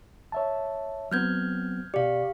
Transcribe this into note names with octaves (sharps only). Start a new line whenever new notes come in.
C#5 E5 A5
F#3 B3 C4 F6 G6 G#6
B2 G4 D5 F5